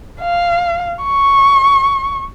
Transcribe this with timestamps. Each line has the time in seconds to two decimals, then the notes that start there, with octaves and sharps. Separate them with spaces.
0.21 F5
1.04 C#6